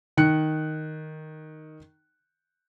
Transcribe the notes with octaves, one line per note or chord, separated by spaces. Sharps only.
D#3 F#6 C#7